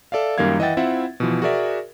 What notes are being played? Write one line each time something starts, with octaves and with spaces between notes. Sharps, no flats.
A4 D5 E5 F5
F#2 D#3 G3 A#3 F5 G#6
E3 D#5 E5 F#5 G5 A6
C4 E4 F4 E5 F#5
B2 E3 F3
F#4 G#4 A#4 D5 E5